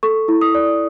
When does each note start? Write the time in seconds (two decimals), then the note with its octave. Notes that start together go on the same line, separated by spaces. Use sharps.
0.03 A4 C#6
0.28 E4
0.41 D#6
0.55 D5